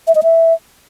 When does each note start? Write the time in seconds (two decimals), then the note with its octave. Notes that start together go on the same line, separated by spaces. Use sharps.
0.07 E5
0.15 D#5
0.23 E5